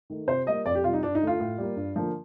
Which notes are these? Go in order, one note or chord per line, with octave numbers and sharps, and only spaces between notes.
D#3 A3
C3 C5
G3 A#3 D#5
F2 D5
G4
C3 G3 F4
D#4
G2 D4
D#4
D3 A3
F4
A2
G3 A#3
G2
D3 F3 A#3